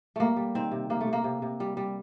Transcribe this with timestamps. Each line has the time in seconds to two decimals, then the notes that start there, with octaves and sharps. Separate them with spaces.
0.16 G3 A3 A#3
0.37 G3
0.55 D#3 C4
0.72 C3
0.90 C3 A#3
1.01 A3
1.07 C3
1.13 A#3
1.24 C3
1.42 C3
1.60 G3
1.77 G3